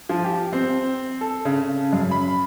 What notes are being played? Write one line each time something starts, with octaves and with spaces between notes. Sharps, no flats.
F3
G4
C4
A4
C#3
F#2
B5